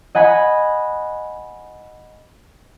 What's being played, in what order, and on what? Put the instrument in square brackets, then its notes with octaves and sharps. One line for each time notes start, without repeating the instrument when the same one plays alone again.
[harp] D#5 F#5 G#5 B5